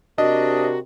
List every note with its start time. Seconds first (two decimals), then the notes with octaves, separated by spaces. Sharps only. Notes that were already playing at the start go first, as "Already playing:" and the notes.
0.18 C3 D4 F#4 A#4 D#5